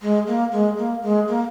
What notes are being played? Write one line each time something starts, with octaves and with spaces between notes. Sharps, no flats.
G#3
A#3
G#3
A#3
G#3
A#3